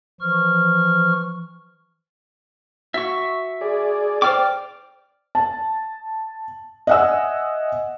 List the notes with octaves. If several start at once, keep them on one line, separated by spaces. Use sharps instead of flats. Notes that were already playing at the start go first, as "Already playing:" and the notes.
E3 F3 C#6 F6
F#4 E5 C#6
G#4 D5
C5 D5 G5 D6 F6
A5
D#5 E5 F#5 G#5 E6